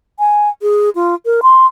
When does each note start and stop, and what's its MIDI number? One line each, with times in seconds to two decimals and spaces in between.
0.19 0.49 80
0.62 0.90 68
0.95 1.15 65
1.26 1.41 70
1.43 1.66 84